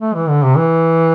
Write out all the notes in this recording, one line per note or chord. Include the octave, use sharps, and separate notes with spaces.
A3
E3
D3
C3
E3